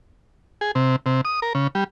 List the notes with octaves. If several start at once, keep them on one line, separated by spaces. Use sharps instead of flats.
G#4
C3
C3
D#6
A#4
C#3
G3